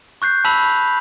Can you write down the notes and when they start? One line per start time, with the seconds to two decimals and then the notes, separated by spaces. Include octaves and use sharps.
0.22 C#6 F#6 G6 C7
0.44 A5 B5 E6 B6 F7 F#7